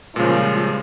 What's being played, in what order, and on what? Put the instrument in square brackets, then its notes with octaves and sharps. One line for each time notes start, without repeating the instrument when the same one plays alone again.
[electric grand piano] A#2 C#3 [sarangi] F3 [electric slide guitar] G3 G#3